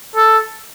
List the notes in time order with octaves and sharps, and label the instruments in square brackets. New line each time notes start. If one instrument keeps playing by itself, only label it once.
[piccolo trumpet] A4